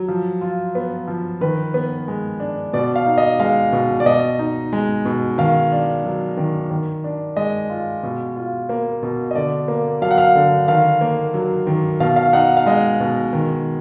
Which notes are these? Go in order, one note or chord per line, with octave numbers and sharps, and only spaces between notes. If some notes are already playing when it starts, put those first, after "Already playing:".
Already playing: F#3
F3
F4
B3
F3
D#3 B4
B3
G#3
D4
B2 D5
F5
D#4
D#5
G#3 F5
B2
D5
B2 D#5
D#4
G#3
B2
D#3 F5
D4
F#3
D#3
D#3
D4
G#3 D#5
F4
B2
F4
A#3
B2
D#5
D3 D5
A#3
F#3 F5
F#5
F5
D3
D#3 F5
A#3
F#3
D#3
B2 F5
F5
D#4 F#5
F5
G#3 D#5
B2
D#3